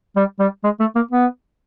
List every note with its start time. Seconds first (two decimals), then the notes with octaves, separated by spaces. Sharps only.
0.16 G3
0.39 G3
0.64 G#3
0.80 A3
0.95 A#3
1.11 B3